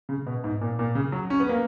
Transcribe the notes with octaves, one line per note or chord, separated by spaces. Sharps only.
C#3
B2
G#2
A#2
A#2
C#3
F#3
C#4
B3
A#3